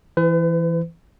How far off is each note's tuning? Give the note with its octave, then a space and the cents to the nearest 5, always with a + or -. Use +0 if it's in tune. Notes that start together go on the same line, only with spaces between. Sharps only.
E3 +5 B4 +40